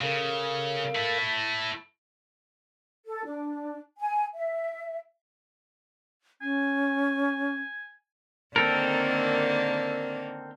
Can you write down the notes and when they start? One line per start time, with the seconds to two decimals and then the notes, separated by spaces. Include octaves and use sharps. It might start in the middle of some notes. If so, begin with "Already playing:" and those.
0.01 C#3 A4 A#4 F5
0.95 A3 E4
3.07 A4
3.25 D4
3.99 G#5
4.34 E5
6.42 C#4 G#5
8.56 D3 D#3 A#3 C4 A4 A#4